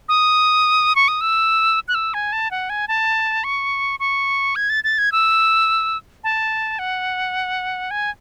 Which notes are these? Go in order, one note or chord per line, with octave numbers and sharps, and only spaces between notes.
D#6
C#6
D#6
E6
F#6
E6
G#5
A5
F#5
G#5
A5
C#6
C#6
G#6
A6
A6
G#6
E6
A5
F#5
G#5